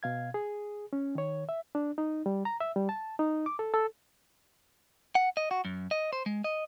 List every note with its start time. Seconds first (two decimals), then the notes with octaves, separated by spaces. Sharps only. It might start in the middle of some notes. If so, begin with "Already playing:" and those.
0.03 B2 F5 G#6
0.34 G#4
0.93 C#4
1.15 D#3 C#5
1.49 E5
1.75 D4
1.98 D#4
2.26 G3
2.45 A#5
2.60 E5
2.76 G3
2.89 A5
3.19 D#4
3.46 D6
3.59 A4
3.74 A4
5.15 F#5
5.37 D#5
5.51 F#4
5.65 F#2
5.91 D#5
6.13 C5
6.26 G#3
6.44 D#5